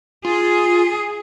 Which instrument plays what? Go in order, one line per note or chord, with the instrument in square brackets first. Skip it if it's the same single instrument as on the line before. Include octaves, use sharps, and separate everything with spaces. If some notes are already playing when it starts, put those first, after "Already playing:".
[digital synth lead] F4 [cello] G#4